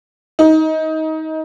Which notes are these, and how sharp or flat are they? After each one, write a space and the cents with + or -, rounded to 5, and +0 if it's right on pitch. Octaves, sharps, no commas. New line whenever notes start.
D#4 +20